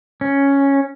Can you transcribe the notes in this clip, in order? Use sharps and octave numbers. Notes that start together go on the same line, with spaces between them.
C#4